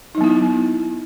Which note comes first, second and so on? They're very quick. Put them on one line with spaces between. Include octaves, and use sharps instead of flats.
D#4 F#3 B3 E4